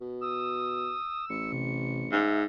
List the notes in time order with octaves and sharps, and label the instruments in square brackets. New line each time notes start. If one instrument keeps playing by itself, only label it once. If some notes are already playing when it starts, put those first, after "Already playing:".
[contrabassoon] B2
[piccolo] D#6 [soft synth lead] E6
[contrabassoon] A1 [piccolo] C#7
[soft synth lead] C3
[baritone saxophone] G#2 [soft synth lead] E5